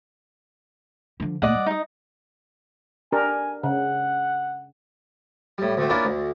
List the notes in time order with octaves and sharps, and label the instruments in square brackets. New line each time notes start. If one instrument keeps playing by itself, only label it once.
[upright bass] D3 F3
[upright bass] A#2 A3 [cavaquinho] D5 D#5 F#5
[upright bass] G3
[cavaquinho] D#4 D#5
[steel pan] D4 G4 A#4 [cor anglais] G#5
[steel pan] C#3 [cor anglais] F#5
[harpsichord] A2 G3
D2 D3 A3 C4
A#3 C#4 D4 E4 F4
D2